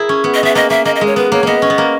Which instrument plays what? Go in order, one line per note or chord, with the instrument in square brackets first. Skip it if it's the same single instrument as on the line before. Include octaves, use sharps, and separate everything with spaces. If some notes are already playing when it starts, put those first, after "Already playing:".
Already playing: [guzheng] E4 G#4 A#4
C#4
B3
[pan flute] D#5
[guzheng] B3 [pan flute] E5
[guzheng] A#3 [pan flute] D#5
[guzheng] A#3 [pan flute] E5
[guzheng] A#3 [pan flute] D#5
[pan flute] D#5
[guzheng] G#3
[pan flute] C#5
[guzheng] B3 [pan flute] B4
[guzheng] A#3 [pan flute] C#5
[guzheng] A#3 B3 [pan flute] D#5
[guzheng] C#4
B3
A#3